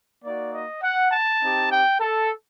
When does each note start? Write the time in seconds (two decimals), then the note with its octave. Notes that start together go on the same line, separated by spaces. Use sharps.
0.24 A#3 D#4 F#4 D5
0.54 D#5
0.83 F#5
1.12 A5
1.42 C4 D#4 G4
1.71 G5
2.00 A4